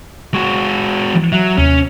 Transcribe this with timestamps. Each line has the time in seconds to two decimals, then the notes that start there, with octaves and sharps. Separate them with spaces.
0.34 G#3 F#4 C#6
1.14 E3 F3
1.32 F#3 E5 F#6
1.58 D#2 C3 C#4